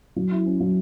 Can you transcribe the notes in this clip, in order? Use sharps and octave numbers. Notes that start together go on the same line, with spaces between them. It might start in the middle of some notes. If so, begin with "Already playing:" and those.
F#3
E4
C#4
F#3